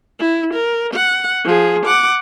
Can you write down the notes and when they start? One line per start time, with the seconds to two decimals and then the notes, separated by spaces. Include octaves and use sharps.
0.19 E4
0.54 A#4
0.94 F#5
1.45 F3 G#4
1.86 F#5 D6